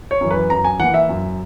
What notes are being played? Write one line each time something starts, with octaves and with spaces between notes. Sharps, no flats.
C#5
F#2 E3
B4
F#2 A#5
G#5
E3 A#3 F#5
E5
F#2